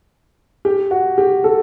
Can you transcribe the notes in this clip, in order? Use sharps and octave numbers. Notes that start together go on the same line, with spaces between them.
G4
F#4
G4
A4